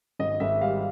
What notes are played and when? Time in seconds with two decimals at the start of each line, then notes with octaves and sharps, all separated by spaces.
0.19 G#1 D#5
0.40 G#1 E5
0.61 G3 F5